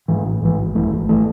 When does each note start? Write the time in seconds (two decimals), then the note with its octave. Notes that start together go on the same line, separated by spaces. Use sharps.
0.08 G#2 E3
0.25 A1
0.42 G#2 E3
0.59 G#1
0.75 F#2 E3 A3
0.92 G#1
1.09 E3 A3